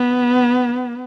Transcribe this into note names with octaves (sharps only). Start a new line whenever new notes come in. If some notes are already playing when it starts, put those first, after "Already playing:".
Already playing: B3